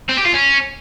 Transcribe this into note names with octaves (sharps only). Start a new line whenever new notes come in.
C4
G4
F4
C#4